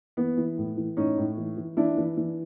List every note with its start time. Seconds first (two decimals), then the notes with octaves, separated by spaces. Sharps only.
0.17 E3 B3
0.37 E3
0.58 A2
0.77 E3
0.97 A2 C#4 D#4
1.18 A2
1.37 E3
1.57 E3
1.77 E3 D4 E4
1.97 E3
2.17 E3